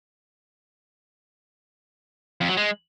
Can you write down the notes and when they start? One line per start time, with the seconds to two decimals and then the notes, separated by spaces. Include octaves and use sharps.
2.41 F2
2.49 F#3
2.57 G#3